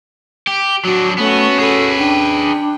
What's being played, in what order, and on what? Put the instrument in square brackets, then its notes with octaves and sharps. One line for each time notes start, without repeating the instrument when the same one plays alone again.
[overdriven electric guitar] G4
[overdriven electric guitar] F#3 D4 [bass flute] F#4
[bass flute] A3 [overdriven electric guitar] B3 [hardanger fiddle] C#4 F#4
[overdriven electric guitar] G#4 B4 [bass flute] A4
[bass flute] D4 [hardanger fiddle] G5